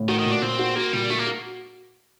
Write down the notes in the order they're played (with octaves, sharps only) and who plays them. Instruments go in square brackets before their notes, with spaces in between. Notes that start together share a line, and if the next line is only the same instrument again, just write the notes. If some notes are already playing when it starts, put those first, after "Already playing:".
Already playing: [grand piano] A2
[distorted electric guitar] D#3 [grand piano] F#4
[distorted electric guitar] D#3
[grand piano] A#2
[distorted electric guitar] D4
[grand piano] A#2 [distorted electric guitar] C4
[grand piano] F#4
[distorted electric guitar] A#3 [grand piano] F#4
[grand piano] A#2 [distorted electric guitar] G3
[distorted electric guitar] A3 [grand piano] F#4
[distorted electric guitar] A#3
[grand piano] F#4